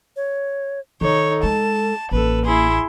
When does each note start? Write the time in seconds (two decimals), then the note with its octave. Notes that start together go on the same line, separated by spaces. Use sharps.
0.16 C#5
1.01 D#3 D#4 A4 C#5
1.43 G#3 A5
2.11 A1 A#3 A4 B4
2.43 E4 G#4 C6